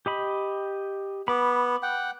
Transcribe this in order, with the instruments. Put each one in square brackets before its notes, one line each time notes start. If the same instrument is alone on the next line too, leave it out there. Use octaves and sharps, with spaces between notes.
[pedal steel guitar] G4 D#5 B5
[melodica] B3 [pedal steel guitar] B5 D6
[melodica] F#5 G5